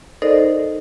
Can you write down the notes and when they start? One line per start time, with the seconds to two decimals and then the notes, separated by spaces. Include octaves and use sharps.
0.22 D#4 A4 A#4 C5 D5 D#5